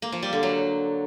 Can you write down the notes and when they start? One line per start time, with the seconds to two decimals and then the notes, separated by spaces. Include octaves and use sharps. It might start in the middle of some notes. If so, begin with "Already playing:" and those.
0.02 A#3
0.12 F3
0.23 G3
0.33 D3
0.43 F#3